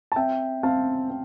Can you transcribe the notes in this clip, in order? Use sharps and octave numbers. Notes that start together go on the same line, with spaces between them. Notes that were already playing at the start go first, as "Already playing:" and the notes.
A5
C4 E5 G5
C4 F5 A5
C4